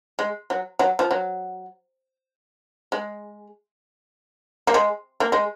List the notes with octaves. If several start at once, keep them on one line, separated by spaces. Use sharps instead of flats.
G#3
F#3
F#3
F3
F#3
G#3
A#3
G#3
A#3
G#3